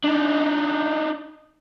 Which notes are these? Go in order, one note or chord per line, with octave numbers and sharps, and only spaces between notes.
D4 D#4